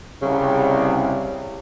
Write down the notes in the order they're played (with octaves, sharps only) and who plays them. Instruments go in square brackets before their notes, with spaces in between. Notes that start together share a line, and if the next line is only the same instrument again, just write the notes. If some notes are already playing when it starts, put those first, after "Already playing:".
[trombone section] C2 [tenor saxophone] C#3